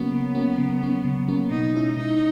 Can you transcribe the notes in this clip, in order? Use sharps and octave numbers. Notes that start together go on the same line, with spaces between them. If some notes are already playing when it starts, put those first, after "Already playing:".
Already playing: C#3 F#3 A#3 B3 C#4
C#3
F#3 A#3 C#4
C#3
F#3 A#3 C#4
C#3
F#3 A#3 C#4
B2 D#4
G#3 C#4 E4
B2 D#4